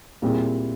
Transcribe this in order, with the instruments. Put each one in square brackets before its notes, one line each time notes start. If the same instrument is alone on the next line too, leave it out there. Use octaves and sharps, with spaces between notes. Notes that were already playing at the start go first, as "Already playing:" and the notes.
[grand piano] A#2 G3 C4 E4 G#4